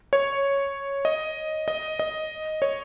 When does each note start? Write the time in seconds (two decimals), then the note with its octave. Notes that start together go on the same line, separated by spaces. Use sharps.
0.13 C#5
1.05 D#5
1.68 D#5
1.99 D#5
2.62 C#5